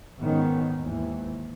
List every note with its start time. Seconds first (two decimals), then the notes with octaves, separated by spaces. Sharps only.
0.19 G#2 D#3 B3 C#4
0.78 G#1 D#2 G#2 E3